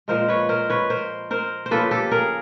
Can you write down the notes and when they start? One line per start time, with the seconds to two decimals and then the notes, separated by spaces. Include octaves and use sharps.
0.08 A#2 F3 G#3 A#4 C5
0.29 B4 C#5
0.49 A#4 C5
0.70 B4 C#5
0.90 A#4 C5
1.31 A#4 C5
1.66 C5
1.71 C#3 F3 A#3 A4 B4
1.91 G4 A4
2.11 G#4 A#4